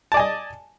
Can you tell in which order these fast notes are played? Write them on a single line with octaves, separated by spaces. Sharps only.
A5 D5 G#5 D#5